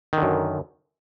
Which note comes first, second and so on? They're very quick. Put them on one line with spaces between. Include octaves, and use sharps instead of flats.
D#3 D3 F#2